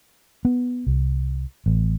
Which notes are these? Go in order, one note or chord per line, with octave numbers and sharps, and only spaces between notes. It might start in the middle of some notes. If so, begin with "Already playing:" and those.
B3
C2
A1